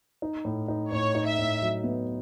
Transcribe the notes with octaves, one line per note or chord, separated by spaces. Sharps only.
D#4
A2
D#4
A2 C#5
D#4
E5
A2
F#3
B3